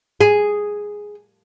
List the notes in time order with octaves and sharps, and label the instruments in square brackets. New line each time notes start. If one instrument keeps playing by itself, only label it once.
[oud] G#4